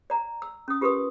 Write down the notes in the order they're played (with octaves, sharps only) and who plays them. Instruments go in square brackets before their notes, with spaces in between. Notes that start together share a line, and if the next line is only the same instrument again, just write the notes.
[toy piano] D5 A#5
E6
C#4 D#6
F4 G4 A#4 B4 C6 D#6